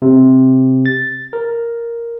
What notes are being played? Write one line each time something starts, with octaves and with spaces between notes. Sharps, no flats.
C3
A6
A#4